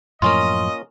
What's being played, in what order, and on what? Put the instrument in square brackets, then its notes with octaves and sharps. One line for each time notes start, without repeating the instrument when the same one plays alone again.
[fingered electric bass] F#2 A2 F3 [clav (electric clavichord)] A#3 C#4 F4 [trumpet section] D#5 [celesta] C6